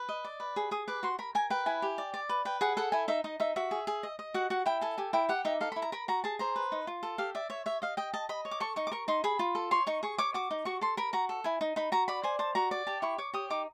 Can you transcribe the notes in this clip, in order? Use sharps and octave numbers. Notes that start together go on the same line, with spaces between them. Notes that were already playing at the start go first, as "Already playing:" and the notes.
Already playing: B4
D#5
D5
B4
G#4
G#4 D#6
B4 D6
F#4 C6
A#4 B5
A#4 G#5
B4 G5
E4 G#5
G4
D5
D5
B4
B4 G5
G#4 F#5
A4 F#5
E4 G#5
D#4 E5
D#4 D#5
D#4 E5
F#4 E5
G#4
G#4
D#5
D#5
F#4 F#5
F#4 F#5
E4 G5
A4 G#5
G4 G#5
E4 G5
G4 F#5
D#4 E5
A4 F5
B5
E4
A#5
A#4 B5
F#4 A#5
G#4 A5
C5 A#5
B4
D#4
F4
A4
G4 F5
D5 E5
C#5 E5
C#5 E5
D#5 F5
D#5 G5
D#5 A5
D#5 B5
C#5
D6
A4 C#6
D#4 C#6
D6
A#4 C#6
D#4 C6
G#4 B5
F4
A4
C#5 C6
D#4 C#6
G#4 C#6
C#5 D6
F#4 D6
D#4
F#4 C#6
A4 C6
A#4 B5
F#4 A#5
A4
E4 G#5
D#4
D#4 B5
F#4 A#5
D5 B5
C5 G#5
C5 A5
F#4 A#5
D5
G4 A5
E4 C#6
C#5 D6
G4 D#6
D#4 D6